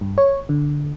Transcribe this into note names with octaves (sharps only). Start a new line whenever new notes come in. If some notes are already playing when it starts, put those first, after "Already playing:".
G2
C#5
D3